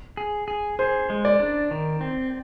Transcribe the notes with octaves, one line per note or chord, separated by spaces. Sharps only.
G#4
G#4
G#4 C5
G#3
D5
D4
D#3
C4